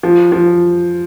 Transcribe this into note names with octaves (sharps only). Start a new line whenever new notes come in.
F3
F3